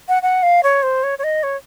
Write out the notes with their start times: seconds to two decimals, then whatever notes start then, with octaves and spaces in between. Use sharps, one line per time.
0.09 F#5
0.22 F#5
0.43 F5
0.63 C#5
0.83 C5
1.03 C#5
1.18 C#5
1.24 D#5
1.43 C#5